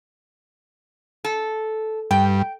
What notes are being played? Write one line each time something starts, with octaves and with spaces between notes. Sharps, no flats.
A4
G2 G5